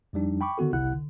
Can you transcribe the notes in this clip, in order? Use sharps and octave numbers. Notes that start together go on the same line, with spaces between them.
F2 F3 G3 D4 D#4
G5 B5 C#6 D6
D3 D#3 B3 F#4 A4
G1 C2 C3 E4 F#5 F#6
D3